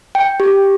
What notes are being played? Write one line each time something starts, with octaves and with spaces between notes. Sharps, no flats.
G5
G4